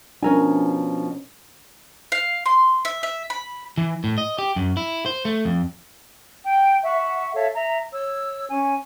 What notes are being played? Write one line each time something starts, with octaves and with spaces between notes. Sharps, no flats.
B2 F3 C#4 D4 A#4 G#5
F5
C6
E5
E5
B5
E3
A2
D#5
G4
F#2
E4
C5
A3
F2
G5
E5 F#5 C#6
A4 C#5 E5 F5
E5 A#5
C#5 E6
C#4 G#5